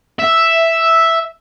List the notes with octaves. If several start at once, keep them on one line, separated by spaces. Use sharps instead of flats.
E5